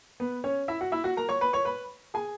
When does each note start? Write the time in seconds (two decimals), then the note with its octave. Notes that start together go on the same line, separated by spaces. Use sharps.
0.20 B3 B4
0.44 C#4 C#5
0.68 E4 E5
0.81 F#4 F#5
0.92 E4 E5
1.04 F#4 F#5
1.17 A#4 A#5
1.29 C#5 C#6
1.41 B4 B5
1.53 C#5 C#6
1.65 B4 B5
2.14 G#4 G#5